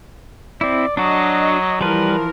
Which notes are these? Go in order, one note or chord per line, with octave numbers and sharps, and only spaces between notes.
C4 E4 D5
F#3 D4 F#4 D#5
E3 F3 G3 A#4 B4